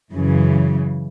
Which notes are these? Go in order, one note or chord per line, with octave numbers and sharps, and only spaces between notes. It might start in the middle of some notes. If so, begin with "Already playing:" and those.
F#2 C#3 E3